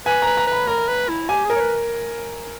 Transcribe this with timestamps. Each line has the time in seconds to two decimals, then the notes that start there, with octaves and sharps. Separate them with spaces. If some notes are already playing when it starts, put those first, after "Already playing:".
0.06 B4 G#5
0.22 B4 A#5
0.37 A#5
0.47 B4 B5
0.67 A#4 A#5
0.88 B4
1.09 E4
1.29 G4 G#5
1.45 G#4 A#4
1.56 C#5
1.60 B4